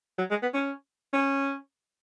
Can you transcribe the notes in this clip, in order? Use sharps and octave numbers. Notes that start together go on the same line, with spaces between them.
F#3
G#3
B3
C#4
C#4